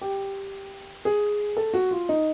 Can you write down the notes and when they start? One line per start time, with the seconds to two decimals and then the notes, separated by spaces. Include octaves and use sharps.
0.01 G4
1.05 G#4
1.57 A4
1.74 F#4
1.91 F4
2.09 D#4